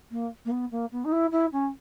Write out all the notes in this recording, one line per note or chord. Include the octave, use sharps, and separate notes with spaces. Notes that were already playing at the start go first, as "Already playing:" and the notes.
A#3
A#3
B3
A#3
B3
D#4
E4
E4
C#4